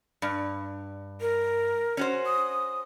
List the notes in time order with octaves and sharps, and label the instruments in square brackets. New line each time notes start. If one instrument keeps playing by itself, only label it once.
[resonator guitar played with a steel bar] G2
[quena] A#4
[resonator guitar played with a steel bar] C#4 F#4 C5
[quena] D#6